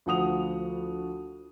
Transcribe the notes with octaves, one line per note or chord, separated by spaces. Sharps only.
D2 F3 F#5 D#6 F7